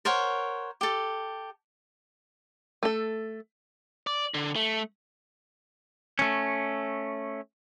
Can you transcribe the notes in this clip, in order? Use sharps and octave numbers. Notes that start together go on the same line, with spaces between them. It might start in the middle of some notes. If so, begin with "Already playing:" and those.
A#4 C5 C#5 F#5
G4 A4
A3 A4
D5
D3
A3
A3 C#4